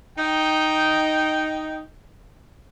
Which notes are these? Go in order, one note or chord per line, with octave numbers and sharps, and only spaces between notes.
D#4 G5